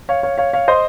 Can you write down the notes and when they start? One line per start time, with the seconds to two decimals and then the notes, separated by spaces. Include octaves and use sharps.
0.09 C#5 F5
0.23 C#5 F5
0.38 C#5 F5
0.53 C#5 F5
0.68 C5 D#5